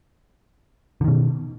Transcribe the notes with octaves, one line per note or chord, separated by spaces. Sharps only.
B2 D3 D#3